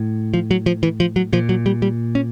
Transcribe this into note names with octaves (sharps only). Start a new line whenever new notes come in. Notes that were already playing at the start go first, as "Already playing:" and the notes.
Already playing: A2
F3
F#3
F3
E3
F3
F#3
A#2 F3
F#3
G3
G3
C#4